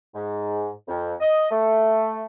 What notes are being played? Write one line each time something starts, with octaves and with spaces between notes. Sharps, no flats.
G#2
F2
D#5
A3